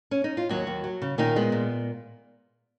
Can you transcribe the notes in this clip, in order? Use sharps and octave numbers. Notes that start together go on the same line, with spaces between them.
C#4
D#4
F4
D#2 F#3 F#4
D#2
F#3
C#3
A#2 D#3 D#4
G#3 B3
A#2